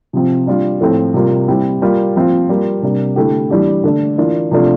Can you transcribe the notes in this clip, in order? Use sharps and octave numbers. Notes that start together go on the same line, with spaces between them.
C3 F3 C4
G3 D4 F4
A2 F3 A3 C4
C3 G3 A#3 F4
G3 C4 E4 G4
G3 A#3 F4
F3 C4 F4
G3 A#3 F4
C3 G3 A#3 D4
D3 A3 E4 G4
E3 G3 D4 G4
D3 A3 D4
E3 A#3 D4 F4
C3 F3 A3 D4 F4